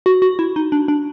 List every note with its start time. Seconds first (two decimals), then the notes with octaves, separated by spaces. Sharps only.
0.06 F#4
0.22 F#4
0.39 E4
0.56 D#4
0.72 D4
0.88 D4